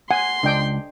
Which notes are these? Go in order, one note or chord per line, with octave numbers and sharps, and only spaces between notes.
F#5 G#5 C6
C#2 D4 D#5 G5